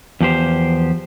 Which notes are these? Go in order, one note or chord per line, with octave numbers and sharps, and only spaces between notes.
E2 F3 G4 C5